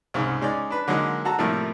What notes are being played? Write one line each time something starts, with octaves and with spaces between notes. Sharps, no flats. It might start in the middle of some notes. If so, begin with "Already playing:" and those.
C2 G#2 C#3
G#3 C#4 D#4 D5
D4 B4
D3 F#3 G#3 A#3 D#4
F#4 A4 A#5
A2 C3 F3 G3 A3 A#3